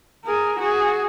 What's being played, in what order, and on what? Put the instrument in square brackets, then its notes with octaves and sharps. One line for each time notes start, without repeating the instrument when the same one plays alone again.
[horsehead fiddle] G#4 A#4
F#4 G#4